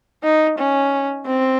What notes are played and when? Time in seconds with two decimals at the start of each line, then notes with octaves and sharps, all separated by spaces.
0.23 D#4
0.58 C#4
1.26 C4